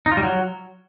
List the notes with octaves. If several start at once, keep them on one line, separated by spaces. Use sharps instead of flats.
D#4
F4
G3
F#3